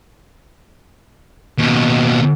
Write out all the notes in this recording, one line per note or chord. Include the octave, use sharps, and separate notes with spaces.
D#2 B2